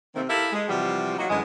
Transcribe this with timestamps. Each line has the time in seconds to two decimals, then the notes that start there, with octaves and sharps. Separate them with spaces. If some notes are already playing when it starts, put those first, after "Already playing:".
0.15 C3 D#3 A3 A#3 C4
0.28 E4 G4 A4 A#4 E5 F5
0.52 G#3
0.68 C3 E3 F3 G3 F#4 G4
1.19 F#3 A#3 D#4 F4 F#4
1.30 F#2 D3 E3 G#3